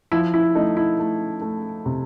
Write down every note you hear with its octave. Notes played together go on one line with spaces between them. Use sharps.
F3 E4
E4
A3 D#4
E4
A3
A3
C3